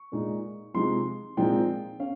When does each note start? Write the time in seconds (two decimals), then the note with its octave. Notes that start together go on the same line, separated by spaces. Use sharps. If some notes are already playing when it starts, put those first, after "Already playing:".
Already playing: C#6
0.12 A#2 G#3 D#4
0.74 C3 F3 G#3 D#4 C6
1.37 A#2 F3 G#3 C4 D#4 G5
2.00 C#4 F5